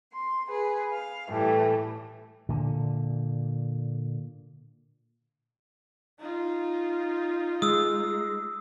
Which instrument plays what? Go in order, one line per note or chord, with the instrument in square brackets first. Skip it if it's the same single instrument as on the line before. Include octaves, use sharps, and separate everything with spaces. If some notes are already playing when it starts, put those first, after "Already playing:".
[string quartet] C6
G#4 B4
F5
A2 E3 G3 A3
[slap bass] A#2 D3
[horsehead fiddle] D#4 F4
[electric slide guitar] G#3 [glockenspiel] D#6 E6